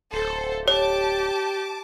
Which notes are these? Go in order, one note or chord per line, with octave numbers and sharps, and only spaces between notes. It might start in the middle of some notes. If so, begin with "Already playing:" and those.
D1 A4 C5
G4 C#5 A5 D6